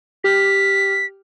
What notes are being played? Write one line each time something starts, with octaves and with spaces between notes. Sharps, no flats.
G4 F6 B6